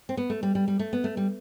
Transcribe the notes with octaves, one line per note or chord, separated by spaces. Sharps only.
C4
B3
A3
G3
G3
G3
A3
B3
A3
G3